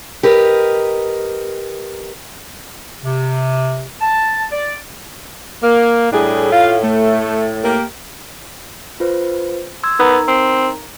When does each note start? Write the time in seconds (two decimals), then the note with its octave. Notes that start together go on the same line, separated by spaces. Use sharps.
0.23 G4 A#4 B4 D#5
3.04 C3
4.01 A5
4.51 D5
5.63 A#3
6.12 A2 G3 D4 G#4
6.52 F4 F5
6.83 A3
7.63 A#3 G4 A#4
9.00 F4 B4 C5
9.83 C6 E6 G#6
9.99 B3 D#4 A#4 A#5
10.28 C4